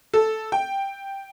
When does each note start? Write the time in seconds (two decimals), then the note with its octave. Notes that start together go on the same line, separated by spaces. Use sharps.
0.14 A4
0.52 G5